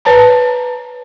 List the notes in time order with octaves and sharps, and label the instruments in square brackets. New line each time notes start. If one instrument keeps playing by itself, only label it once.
[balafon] B4 C#5 A5 A#5